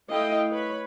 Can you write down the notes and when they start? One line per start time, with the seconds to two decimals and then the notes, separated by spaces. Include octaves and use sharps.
0.10 A3 E4 D#5 F5 G5
0.50 B4 C#5 B5